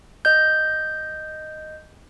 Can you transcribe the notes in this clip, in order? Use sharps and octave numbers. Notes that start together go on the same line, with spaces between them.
D#5 G6